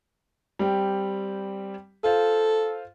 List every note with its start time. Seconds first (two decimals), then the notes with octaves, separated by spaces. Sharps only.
0.59 G3 C4 G4
2.04 F4 A4 C5 F5